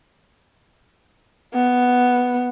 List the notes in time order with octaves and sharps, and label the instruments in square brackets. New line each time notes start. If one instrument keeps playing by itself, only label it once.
[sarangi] B3